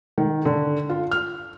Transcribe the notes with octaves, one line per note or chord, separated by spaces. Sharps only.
D#3
D3
F4
F6